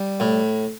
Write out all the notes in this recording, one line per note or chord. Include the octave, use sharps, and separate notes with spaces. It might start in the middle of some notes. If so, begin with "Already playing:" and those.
Already playing: G3
A2